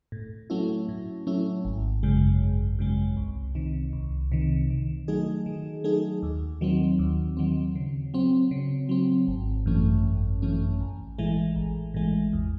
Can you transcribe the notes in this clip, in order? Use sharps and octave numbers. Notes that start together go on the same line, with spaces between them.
A2
F#3 A3 C#4 E4
A2
F#3 A3 C#4 E4
G#1
F#2 C#3 G#3
G#1
F#2 C#3 G#3
C2
C3 D#3
C2
C3 D#3
D#3
F#3 A3 D#4 G#4
D#3
F#3 A3 D#4 G#4
D#2
D#3 F#3 C4
D#2
D#3 F#3 C4
C#3
F#3 C4
C#3
F#3 C4
G#1
F#2 E3 A3 C#4
G#1
F#2 E3 A3 C#4
A1
A2 E3 G#3
A1
A2 E3 G#3
E2